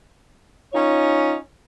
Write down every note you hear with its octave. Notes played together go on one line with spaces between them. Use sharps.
C#4 D#4 F4 C#5